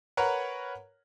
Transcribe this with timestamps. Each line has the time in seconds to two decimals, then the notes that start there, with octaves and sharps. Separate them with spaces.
0.17 A#4 B4 C#5 F#5